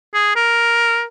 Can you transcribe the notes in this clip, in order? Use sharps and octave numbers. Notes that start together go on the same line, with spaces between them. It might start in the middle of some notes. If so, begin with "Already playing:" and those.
G#4
A#4